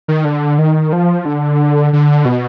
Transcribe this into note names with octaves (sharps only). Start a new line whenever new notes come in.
D#3
D3
D#3
F3
D3
D3
B2